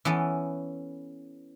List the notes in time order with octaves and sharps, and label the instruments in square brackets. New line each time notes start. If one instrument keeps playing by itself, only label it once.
[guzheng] E3 B3 C#4 A4